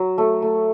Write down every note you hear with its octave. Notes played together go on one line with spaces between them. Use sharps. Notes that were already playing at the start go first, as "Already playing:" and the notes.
Already playing: F#3
A3
A3